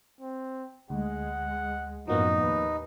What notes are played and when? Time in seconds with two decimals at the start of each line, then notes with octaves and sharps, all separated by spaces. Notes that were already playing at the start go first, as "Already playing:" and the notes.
0.21 C4
0.90 D2 G#3 F#5
2.07 F#2 A2 F3 A#3 B3 D#4 F#4
2.41 D#2 B4